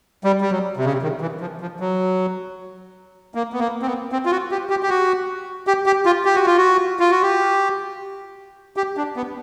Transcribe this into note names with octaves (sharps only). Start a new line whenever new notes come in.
G3
G3
F#3
C3
C#3
C3
D#3
E3
F3
F3
F#3
A#3
B3
A#3
C4
B3
C4
F4
F#4
G4
G4
G4
F#4
G4
G4
F4
G4
F#4
F4
F#4
F4
F#4
G4
G4
D4
B3